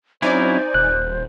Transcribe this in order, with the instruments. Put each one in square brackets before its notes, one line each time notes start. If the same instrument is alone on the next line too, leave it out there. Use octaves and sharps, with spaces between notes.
[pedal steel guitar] F#3 C#4 E4 [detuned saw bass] C4 [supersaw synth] D#4 D5 G#5 [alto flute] C5
[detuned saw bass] D#1 [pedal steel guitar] F#6